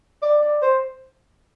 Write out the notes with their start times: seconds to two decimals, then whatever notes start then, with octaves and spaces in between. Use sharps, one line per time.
0.22 D5
0.41 D5
0.62 C5